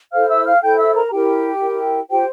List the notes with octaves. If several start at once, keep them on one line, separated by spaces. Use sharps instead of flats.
E4 A4 C5 F5 F6
E5 E6
F5 F6
E4 A4 C5 G5 G6
E5 E6
A#4 A#5
E4 G4 A#4 G5
E4 A#4
F4 G4 C5 G5